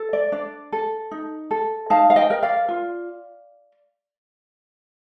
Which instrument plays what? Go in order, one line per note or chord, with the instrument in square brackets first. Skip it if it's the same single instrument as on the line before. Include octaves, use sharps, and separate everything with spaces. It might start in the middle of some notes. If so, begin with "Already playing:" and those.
Already playing: [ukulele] A4
D5
D4 D5
A4
D#4
A4
D#4 F5 A5
F5
D#5 G5
A#4
D5 F5
F4